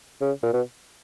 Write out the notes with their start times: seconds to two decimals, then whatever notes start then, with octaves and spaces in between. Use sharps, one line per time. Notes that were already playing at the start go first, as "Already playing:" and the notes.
0.21 C#3
0.43 A#2
0.53 B2